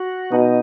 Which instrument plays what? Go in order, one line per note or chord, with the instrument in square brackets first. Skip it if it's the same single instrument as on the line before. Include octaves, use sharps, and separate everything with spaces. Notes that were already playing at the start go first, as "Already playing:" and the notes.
Already playing: [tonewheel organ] F#4
[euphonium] B2 [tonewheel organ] D#4